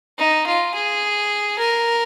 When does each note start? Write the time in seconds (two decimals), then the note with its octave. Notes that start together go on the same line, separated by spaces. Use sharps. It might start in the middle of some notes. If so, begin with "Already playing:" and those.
0.19 D#4
0.47 F4
0.75 G#4
1.59 A#4